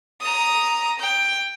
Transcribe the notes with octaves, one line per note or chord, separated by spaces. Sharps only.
A#5 D#6
G5